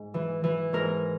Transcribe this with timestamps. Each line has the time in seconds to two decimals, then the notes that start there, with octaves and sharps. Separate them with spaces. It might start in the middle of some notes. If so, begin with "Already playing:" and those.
Already playing: G#2
0.14 E3
0.44 E3
0.73 G#2 A#4